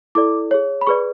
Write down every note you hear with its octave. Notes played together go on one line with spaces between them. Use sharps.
E4 A4 D5 D6
G#4 C#5
B5
G#4 B4 D5 C#6